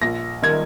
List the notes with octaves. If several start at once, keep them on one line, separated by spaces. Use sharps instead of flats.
A#1 A#6
D#3 G#6